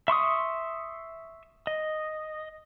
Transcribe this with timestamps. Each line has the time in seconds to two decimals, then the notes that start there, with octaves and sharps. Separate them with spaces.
0.08 E5 C6 C#6 D#6
1.67 D#5